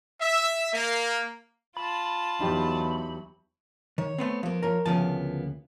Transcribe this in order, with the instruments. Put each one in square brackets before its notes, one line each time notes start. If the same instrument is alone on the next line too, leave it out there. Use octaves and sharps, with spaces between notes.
[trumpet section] E5
A#3
[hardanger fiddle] F4 A5 [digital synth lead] B5
[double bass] E2 F#3 [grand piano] D#4 G4
[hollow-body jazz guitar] D#3 [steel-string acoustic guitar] C#5
[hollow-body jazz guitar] A3 B3 C4
[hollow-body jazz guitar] F3 [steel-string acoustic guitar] A#3 B3
[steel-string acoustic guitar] F3 C#5 [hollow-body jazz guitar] A#4
[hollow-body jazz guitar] D2 C#3 A5 [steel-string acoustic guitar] F3 A#3 B3